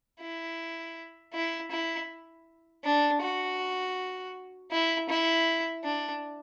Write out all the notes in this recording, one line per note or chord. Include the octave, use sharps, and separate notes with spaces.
E4
E4
E4
D4
F#4
E4
E4
D4